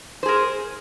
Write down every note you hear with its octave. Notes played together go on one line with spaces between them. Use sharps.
G#4 A#4 C5